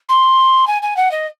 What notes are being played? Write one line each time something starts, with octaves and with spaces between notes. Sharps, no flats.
C6
G#5
G#5
F#5
D#5